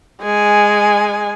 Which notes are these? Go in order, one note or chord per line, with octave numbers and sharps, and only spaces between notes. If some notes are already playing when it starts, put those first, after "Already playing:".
G#3 G#5